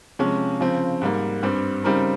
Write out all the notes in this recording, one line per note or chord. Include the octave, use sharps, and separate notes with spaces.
C3 F3 G#3 C#4
C#3 F3 C4
G#2 G3 A#3
G2 G3 C4
C#3 G3 C4 D#4 A#4